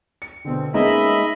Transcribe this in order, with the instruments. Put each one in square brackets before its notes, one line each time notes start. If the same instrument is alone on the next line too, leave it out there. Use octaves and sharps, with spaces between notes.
[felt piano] C#7
[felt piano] B2 D3 [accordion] C4
[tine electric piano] G#3 D#4 [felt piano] A#3 B3 C#4 [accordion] D#5 E5 B5